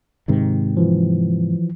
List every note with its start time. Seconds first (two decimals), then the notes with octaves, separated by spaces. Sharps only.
0.28 G#2 C3 D#3
0.77 E3 F3